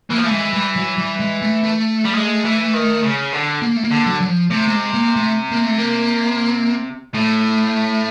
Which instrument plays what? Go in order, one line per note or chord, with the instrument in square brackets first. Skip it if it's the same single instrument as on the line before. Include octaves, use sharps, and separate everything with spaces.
[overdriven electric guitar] E3 [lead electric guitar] A#3
[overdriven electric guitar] F3
[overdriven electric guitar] E3 [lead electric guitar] A3
[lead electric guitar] G#3
G3
F#3
G3
G#3
A3
A3
[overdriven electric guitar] G3
G#3
E3
D#3
C#3
D3
[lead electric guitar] A#3
A3
A#3
[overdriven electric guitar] D3
[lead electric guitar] F#3
F#3
F3
[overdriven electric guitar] C3 [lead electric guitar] A3
[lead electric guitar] A3
G#3
A#3
A3
A#3
A3
A#3
[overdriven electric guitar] A2 [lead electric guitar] A3